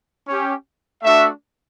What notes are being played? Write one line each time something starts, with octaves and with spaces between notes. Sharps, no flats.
C#4 G4
A3 D4 F#4 E5